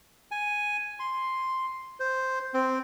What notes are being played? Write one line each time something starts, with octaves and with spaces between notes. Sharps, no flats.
G#5
C6
C5
C4